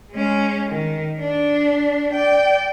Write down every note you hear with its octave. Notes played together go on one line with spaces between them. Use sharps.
G#3 C#4
D#3
D4
D5 G5